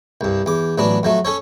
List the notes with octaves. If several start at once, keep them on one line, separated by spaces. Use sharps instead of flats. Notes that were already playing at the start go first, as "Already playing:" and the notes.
C2 G2
E2 D6
A1 F#3 B3 D4
F2 F#3 A3
C#4 A4 C#5